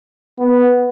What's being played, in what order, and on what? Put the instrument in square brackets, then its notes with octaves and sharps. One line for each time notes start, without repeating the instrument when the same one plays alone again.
[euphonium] B3